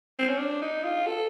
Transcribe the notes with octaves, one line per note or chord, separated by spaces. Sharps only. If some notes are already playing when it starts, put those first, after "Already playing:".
C4
C#4
D4
D#4
F4
A4